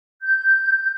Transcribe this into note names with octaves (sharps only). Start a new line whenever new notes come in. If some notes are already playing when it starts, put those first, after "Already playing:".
G6